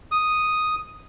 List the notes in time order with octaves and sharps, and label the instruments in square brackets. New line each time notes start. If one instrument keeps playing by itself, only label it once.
[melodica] D#6